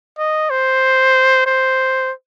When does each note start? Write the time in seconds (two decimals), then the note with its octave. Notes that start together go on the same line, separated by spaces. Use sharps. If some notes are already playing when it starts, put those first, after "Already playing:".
0.19 D#5
0.50 C5
1.46 C5